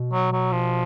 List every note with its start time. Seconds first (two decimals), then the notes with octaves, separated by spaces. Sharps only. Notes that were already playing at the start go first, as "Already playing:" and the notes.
Already playing: B2
0.12 F#3
0.32 F#3
0.52 F3